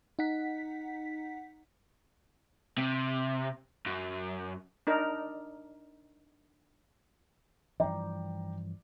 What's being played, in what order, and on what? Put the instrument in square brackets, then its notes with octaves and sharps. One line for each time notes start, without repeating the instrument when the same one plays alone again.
[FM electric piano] D#4 F#5 B6
[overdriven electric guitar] C3
F#2
[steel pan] D4 D#4 A#4
[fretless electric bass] G2 E3 F3 [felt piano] D5 G5 A#5